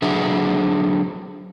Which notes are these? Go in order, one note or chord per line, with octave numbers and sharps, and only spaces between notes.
D3 F#3 D4 F#4 G#4 E5